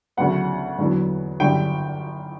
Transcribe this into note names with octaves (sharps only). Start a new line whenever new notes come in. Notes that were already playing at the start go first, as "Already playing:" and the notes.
D2 C#3 F#3 B3 F#5
E2 D3 F#3 B3
G1 F#2 D3 G3 G5